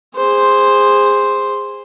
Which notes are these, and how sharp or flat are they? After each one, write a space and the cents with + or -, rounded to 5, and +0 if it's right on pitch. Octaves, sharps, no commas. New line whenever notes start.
G#4 -20 C5 +0